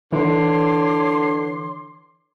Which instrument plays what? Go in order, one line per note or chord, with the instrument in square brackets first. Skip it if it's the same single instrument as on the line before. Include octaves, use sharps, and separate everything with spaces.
[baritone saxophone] D3 [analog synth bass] E3 [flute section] C#5 C6 D6